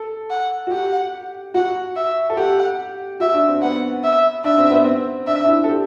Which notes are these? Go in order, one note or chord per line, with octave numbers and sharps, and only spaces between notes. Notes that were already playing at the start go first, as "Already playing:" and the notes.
Already playing: A4
F#5
F#4
G4 F#5
F#4 F#5
E5
A4
G4 F#5
F#4 E5
D4
C4
B3 F#5
E5
D4 E5
C4
B3
C4
D4 E5
D4
E4
A4
G4